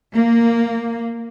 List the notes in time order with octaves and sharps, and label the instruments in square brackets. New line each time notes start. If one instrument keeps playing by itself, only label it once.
[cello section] A#3